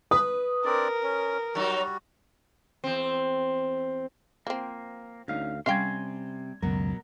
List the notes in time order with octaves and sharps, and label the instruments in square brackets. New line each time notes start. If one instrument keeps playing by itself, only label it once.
[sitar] B4 [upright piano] D#6
[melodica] C4 D4 D5 [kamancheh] A#4
[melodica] C#4
[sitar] F#3 D#4 [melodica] G3 F#4
[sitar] E2 C4
[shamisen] F3 C4 [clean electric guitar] A#3
[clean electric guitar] D2 F5 [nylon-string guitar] C#4 D#4
[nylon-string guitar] C3 G3 C4 [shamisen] C#4 F5 G5 [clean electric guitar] G#5 C6
[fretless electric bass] C#2 F#2 [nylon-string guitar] B2 F#3 [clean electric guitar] A#4